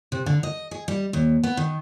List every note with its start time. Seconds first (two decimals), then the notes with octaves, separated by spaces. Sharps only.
0.12 C3
0.26 D3
0.43 D#5
0.71 G#4
0.88 G3
1.13 D#2
1.43 B3
1.57 D#3